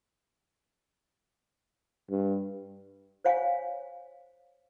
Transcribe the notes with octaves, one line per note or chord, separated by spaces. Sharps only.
G2
C5 C#5 F5 G#5